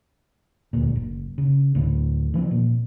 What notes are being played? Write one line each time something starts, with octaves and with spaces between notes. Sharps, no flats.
E1 D2 A#2
F#1
C#3
D2 A2
D#3 F3 A#3 C4
A#2